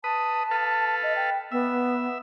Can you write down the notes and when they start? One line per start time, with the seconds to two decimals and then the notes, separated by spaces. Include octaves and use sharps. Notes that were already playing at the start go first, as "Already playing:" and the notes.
0.04 B4 A5 D#6
0.51 A4 B4 F5
1.03 D#5
1.16 G5
1.52 B3 E5